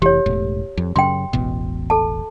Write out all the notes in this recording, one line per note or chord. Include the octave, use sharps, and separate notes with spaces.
F1 E3 G4 C#5
E1 A2
F2
F#2 C#3 G5 C6
E1 A1 B2
A4 A5